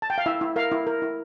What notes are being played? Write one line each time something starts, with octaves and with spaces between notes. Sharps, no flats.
A5
G5
F5
E4 E5
E4
A#4 F5
E4
A#4
E4